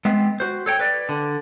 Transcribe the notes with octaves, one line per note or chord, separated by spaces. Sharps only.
G#3 B3 C4
F#4 C5
A4 C#5 G5
B4 D5
D3